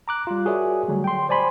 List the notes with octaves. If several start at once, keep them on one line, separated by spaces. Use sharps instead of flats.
A#5 D6 F#6
G3 F4
F#4 G#4 A#4 C#5 D5 E5
D3 F#3 G3 A3
G5 C6
C5 D5 G#5 B5 C6